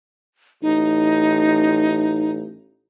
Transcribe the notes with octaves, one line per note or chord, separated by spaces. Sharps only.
A1 D#4